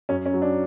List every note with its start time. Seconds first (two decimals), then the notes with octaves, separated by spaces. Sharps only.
0.09 F#2 C#4
0.26 C#4
0.34 F#3
0.42 D4